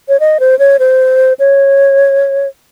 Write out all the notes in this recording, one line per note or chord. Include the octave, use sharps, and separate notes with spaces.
C#5
D#5
C5
C#5
C5
C#5